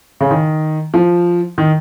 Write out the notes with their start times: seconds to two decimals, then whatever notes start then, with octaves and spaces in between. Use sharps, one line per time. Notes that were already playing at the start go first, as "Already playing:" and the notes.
0.21 C#3
0.31 D#3
0.94 F3
1.58 D#3